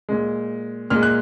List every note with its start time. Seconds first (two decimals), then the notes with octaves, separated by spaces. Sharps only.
0.09 A#2 G#3
0.90 A#2 G#3 F6
1.03 F#6